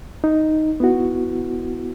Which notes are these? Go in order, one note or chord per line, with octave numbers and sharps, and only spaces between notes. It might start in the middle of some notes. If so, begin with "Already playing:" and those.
D#4
B3 E4 F#4